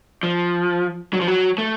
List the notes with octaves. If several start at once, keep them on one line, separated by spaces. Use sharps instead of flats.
F3
F#3
F3
F#3
A3